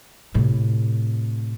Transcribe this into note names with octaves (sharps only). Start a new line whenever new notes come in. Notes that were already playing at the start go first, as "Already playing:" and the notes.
A2 C3